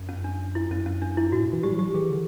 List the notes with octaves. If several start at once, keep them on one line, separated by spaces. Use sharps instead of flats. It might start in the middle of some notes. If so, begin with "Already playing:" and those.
Already playing: F#2
C#4
D4
E4
F#2 C#4
C#4
D4
E4
A2 F#4
A#2
E3
G3 G4
F#3
G4
E3
E3 G#4
D3